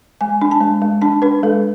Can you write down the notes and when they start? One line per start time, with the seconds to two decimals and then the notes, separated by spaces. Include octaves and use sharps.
0.21 G#3 G#5
0.41 D4
0.51 A5
0.61 G#3
0.82 G#3
1.01 D4 A5
1.22 D4 B4
1.43 G#3 A4